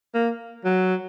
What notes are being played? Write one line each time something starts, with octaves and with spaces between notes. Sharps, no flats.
A#3
F#3